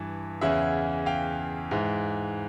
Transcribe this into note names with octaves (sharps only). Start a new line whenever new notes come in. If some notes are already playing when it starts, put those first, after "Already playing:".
Already playing: G2 E3
E2 C#3 E3 E5 F#5
F5 G5
G#2 E3